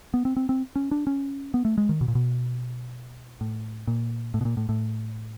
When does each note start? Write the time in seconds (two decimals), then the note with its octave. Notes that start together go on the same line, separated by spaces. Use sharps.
0.14 B3
0.25 C4
0.36 C4
0.49 C4
0.76 C#4
0.91 D4
1.07 C#4
1.54 B3
1.65 A3
1.78 G#3
1.89 D#3
2.01 B2
2.08 A#2
2.15 B2
3.41 A2
3.87 A#2
4.34 A2
4.41 B2
4.45 A#2
4.57 A2
4.69 A2